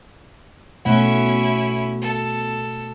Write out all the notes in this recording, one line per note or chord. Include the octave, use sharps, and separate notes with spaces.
B2 A3 C#4 E4 F#5
A4